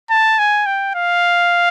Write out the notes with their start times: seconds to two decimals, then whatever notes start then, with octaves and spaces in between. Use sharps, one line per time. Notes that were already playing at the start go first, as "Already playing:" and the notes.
0.10 A5
0.39 G#5
0.66 G5
0.95 F5